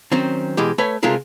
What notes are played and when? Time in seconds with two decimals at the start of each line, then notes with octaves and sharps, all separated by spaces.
0.12 D#3 F#3 C4 C#4
0.57 B2 E3 G#3 G4
0.78 A3 B4 C#5 G#5
1.03 C3 G#3 A3 F4 G#4 A#4